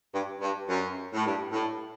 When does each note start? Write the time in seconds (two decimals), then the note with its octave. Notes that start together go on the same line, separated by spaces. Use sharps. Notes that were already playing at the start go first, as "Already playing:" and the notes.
0.12 G2
0.40 G2
0.68 F#2
1.13 A2
1.25 G2
1.52 A2